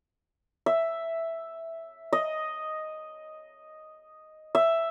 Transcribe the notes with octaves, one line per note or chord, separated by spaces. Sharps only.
E5
D#5
E5